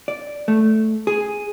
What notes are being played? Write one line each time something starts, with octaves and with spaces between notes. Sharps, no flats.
D5
A3
G#4